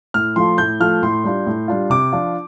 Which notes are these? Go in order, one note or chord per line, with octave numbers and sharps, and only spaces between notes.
A2 F6
F3 A3 F4 C6
A2 G6
F3 A3 F4 F6
A2 C6
G3 D4 F4
A2
G3 D4 F4
C3 D6
F3 D4 F4